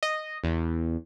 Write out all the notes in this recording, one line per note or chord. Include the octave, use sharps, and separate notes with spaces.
D#5
E2